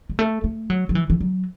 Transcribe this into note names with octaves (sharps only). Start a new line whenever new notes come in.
G#3
A3
A3
F#3
F#3
E3
E3
F#3